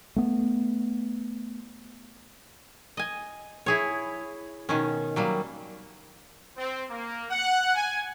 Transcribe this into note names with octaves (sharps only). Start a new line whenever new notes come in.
A3 B3
D#5 G#5
E4 G#4 C#5
B2 D#3 C#4
F#3 G3 A#3
C4
A#3
F#5
G#5